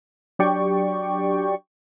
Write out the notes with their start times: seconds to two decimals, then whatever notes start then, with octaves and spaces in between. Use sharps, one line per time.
0.39 F#3 D4 G4 D5 G5 C#6